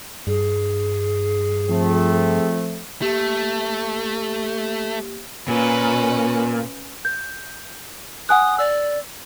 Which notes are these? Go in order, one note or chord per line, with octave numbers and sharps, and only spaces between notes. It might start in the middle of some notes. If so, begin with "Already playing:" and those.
G2 G#4
F3 A3 C4
A3 A#3 G4
A#2 C#4 B4
G6
F#5 G#5 D#6 F#6
D5 E6